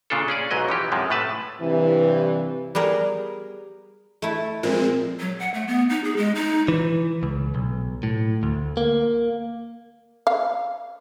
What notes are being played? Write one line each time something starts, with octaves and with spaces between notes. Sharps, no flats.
A#2 C#3 D4 F4 A4
C#4 G#4 D5
B1 G#2 F#3 C#4 D#5
E3 F3 G4
F#2 C3 F3 G#3
A2 A3 B4 A5
G2 C3 E3
G3 B3 G#4 A#4
A3 E4
A#2 F3 G#3 C4
F#3
F#5
A3
B3
D#4
G#4
G#3
D#4
E3
C#2
B1
A2
D2
A#3
F5